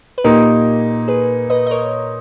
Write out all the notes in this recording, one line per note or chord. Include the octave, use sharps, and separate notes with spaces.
B4
A#2 A#3 D#4 G4 A#4
G#4 B4
B4 D#5
D#5
A#4 C#5